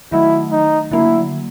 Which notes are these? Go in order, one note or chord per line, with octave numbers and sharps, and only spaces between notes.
D#3 F#3 A3 E4
D#4
D3 F#3 A#3 E4